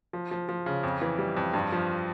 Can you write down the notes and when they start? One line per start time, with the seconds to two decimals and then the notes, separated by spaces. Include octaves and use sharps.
0.13 F3
0.31 F3
0.49 F3
0.66 C#3
0.83 F2
1.02 E3
1.19 G3
1.37 F2
1.54 G2
1.72 F3